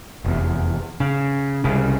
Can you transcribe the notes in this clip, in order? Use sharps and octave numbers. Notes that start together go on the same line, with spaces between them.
F1 E2
C#3
C2 C#3